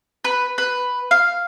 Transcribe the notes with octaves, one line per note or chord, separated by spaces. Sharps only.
B4
B4
F5